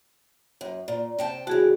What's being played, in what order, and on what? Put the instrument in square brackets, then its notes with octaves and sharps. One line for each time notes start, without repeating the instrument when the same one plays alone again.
[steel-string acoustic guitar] F#2
A#2
C3 G5 A5
[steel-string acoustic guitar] E2 C#3 [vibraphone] F#4 G#4